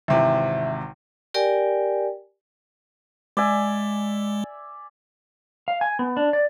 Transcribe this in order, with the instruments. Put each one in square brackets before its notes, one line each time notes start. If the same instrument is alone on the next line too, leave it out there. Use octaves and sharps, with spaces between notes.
[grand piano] G#1 C3 E3 [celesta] E5
[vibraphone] G4 A#4 D5 G5 G#5
[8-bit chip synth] G#3 [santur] D5 E5 G#5
[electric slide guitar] F5
G#5
B3
D4
D5